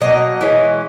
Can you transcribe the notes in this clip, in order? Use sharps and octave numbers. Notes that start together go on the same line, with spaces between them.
B2 F#3 A#3 D#5
E3 G#3 C#4